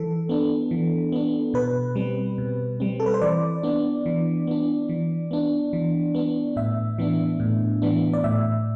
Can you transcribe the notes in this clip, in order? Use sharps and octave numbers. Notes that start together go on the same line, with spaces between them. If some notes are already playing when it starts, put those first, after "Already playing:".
Already playing: E3 A4
B3 D4
E3
B3 D4
B2 B4
G3 C4
B2
G3 C4
A4
B4
C5
E3 D5
B3 D4
E3
B3 D4
E3
B3 D4
E3
B3 D4
A2 E5
E3 B3 D4
A2
E3 B3 D4
D5
A2 E5